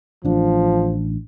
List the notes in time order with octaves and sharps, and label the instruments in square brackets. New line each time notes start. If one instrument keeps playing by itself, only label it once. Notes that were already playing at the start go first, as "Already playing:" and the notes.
[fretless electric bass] A1 D4 [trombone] F3